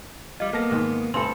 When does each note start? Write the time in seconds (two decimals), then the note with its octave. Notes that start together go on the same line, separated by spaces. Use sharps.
0.40 G3 F4 D#5
0.53 A#3 B3 A4 A5 A#6
0.71 G#2 D#3
1.14 D2 G2 C4 A4 G#5 C6 F#7